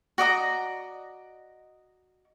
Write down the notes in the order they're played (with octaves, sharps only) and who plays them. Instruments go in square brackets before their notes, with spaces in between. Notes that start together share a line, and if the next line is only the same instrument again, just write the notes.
[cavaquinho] F#4 D5 D#5 A#5